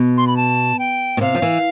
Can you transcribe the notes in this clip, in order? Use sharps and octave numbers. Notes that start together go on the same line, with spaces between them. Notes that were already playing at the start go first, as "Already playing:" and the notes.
Already playing: B2
C6
B5
A5
G5
B2
C3 F5
F3
E3